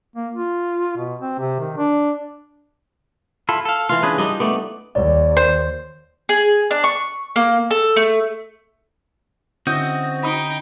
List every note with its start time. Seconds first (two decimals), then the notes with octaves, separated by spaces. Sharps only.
0.16 A#3
0.34 F4
0.98 B2
1.22 C4
1.39 C3
1.60 D#3
1.77 D4
3.49 E4 F4 A4
3.65 A4 F5
3.89 E3 F4 F5
4.03 C#4 D4 G#4 B4
4.18 G3 D4 D#4 D#5
4.40 A3 B3 D5
4.95 D#2 C#5 D5
5.37 C5
6.29 G#4
6.71 D4
6.84 C#6
7.36 A#3
7.71 A4
7.96 A3
9.67 D3 C4 C#4 E4 F#4 D#5 D#6 G6
10.23 D#4 G5 B5 D#6